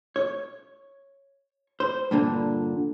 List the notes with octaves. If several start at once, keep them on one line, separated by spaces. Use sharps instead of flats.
C#5
C5
G2 A#2 D3